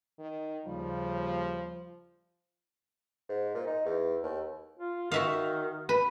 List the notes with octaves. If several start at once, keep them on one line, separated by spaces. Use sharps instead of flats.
D#3
D#2 C#3 F3 G3
G#2
A#2
D#4
E2
D#2
F4
D#3 F#4 E5 F5
B4